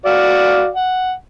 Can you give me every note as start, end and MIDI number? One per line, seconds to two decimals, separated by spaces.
0.06 0.68 66
0.06 0.68 74
0.06 0.68 77
0.75 1.12 78